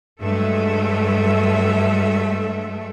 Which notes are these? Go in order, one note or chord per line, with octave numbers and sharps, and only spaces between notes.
G2 F#3 G#3 A3 A4 E5